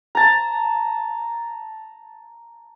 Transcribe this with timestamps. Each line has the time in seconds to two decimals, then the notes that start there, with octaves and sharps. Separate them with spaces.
0.15 A5 A#5